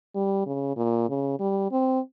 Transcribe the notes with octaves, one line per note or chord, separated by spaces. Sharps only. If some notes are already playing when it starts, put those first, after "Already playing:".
G3
C#3
A#2
C#3
G3
C4